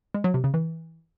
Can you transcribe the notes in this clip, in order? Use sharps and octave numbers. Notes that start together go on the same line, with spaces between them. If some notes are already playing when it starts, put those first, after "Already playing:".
G#3
F#3
C3
C#3
E3